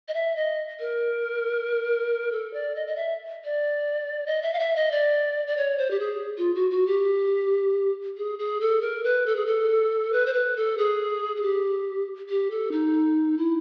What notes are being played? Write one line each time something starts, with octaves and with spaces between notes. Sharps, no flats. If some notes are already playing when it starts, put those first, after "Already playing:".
D#5
E5
D#5
A#4
A4
D5
D#5
D#5
E5
D5
D#5
E5
F5
E5
D#5
D5
D5
C#5
C5
G4
G#4
F4
F#4
F#4
G4
G#4
G#4
A4
A#4
B4
A4
G#4
A4
B4
C5
B4
A4
G#4
G#4
G4
G4
A4
D#4
E4